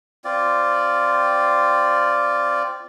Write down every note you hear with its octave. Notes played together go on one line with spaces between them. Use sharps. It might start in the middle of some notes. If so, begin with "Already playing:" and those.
C4 F4 D5